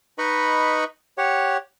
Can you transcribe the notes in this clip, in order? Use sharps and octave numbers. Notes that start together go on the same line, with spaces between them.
D#4 B4 D#5 B5 C#6
G4 C#5 F#5